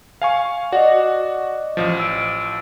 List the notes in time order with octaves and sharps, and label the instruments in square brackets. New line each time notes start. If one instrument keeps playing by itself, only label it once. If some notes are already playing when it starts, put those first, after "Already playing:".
[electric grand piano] F5 G#5 C#6
[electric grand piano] F#4 F#5 [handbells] D5 D#5
[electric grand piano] A1 F3
[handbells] E6 D7